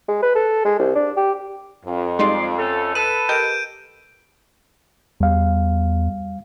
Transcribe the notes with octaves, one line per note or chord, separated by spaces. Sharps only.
G#3
B4
A4
G#3
C2
D4
G4
F2
G3 G#3 D#4 D5 C6
A3 C#4 A4
A4 B4 F#6 D#7
G4 A#4 D#5 G6 D7
E2 G3 F5